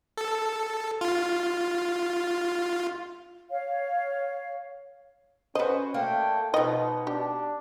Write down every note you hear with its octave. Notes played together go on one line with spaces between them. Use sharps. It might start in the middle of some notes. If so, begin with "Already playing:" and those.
A4
F4
C#5 F5
C#4 F#4 B4 C5 D#5
A3 A#3 D4 G5
B2 F3 B3 D#4 D#5
D4 G4